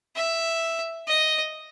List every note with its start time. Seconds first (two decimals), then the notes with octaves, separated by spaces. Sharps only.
0.16 E5
1.07 D#5